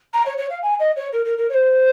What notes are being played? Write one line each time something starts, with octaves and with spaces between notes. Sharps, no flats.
A#5
C#5
C#5
F5
G#5
D#5
C#5
A#4
A#4
A#4
C#5
C5